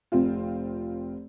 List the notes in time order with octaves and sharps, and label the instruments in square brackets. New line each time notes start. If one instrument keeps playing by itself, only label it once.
[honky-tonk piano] F1 C4 F4